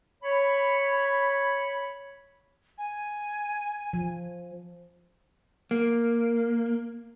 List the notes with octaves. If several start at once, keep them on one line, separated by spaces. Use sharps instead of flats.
C#5 B5
G#5
F3
A#3